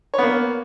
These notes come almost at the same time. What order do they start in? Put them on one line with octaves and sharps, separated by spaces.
C#5 B3 A#3